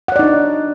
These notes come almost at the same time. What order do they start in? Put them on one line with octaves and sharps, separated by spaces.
F#5 C#5 D5 D#4 D4